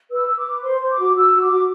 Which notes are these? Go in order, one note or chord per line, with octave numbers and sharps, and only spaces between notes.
B4 E6
B4
D6
B4
C5 C6
C5
D6
F#4
F#4 E6
F#4
D6
F#4